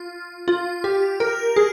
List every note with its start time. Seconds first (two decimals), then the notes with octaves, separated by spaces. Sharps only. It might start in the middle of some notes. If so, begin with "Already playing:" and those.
Already playing: F4
0.48 F4
0.84 G4
1.20 A#4
1.56 G#4